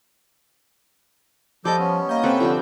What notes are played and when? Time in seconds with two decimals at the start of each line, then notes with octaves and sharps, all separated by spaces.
1.65 F3 G3 A4 D#5 D6 G6
1.79 B3 C#4
2.09 A#3 D#5 G6
2.23 C3 C4 A4 B4 C5 G5
2.40 D3 F3 G3 D4